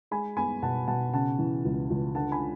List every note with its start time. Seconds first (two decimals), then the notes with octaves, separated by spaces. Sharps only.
0.11 G#3 G#5 B5
0.37 B3 G#5 B5
0.62 B2 F#5 A5
0.88 B2 F#5 A5
1.13 C#3 F#5 A5
1.39 E3
1.65 C#2
1.90 C#2
2.15 D3 F#5 A5
2.32 G#5 B5